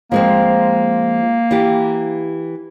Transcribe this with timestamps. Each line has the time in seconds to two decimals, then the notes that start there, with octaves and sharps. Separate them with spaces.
0.12 F3 G#3 A#3 C4
1.51 E3 G4